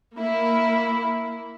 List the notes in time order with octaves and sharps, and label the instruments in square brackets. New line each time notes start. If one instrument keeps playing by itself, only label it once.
[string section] A#3 E4